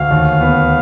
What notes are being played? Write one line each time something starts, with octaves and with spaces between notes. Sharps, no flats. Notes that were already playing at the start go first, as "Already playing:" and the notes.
Already playing: D2 F5
D#2
B3